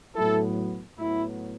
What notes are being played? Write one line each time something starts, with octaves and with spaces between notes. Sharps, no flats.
A2 F#3 B3 E4 A4
A2 F#3 B3 E4